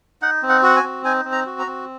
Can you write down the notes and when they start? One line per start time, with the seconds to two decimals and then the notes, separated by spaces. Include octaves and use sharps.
0.22 D#4 F#5
0.43 C4
0.49 F#5
0.63 F#4 F#5
0.76 G#5
0.83 C4
1.05 D#4 G#5
1.25 C4
1.32 A#5
1.46 F#4
1.59 A#5
1.66 C4